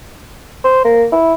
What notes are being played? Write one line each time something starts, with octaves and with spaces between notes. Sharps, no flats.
C5
A#3
E4